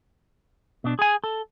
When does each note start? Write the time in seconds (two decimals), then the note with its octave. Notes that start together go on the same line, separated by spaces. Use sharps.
0.84 B2 D4
0.99 G#4 G#5
1.24 A4